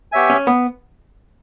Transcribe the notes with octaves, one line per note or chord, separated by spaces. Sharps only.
B3 G4 C#5 E5 G#5
C#4
B3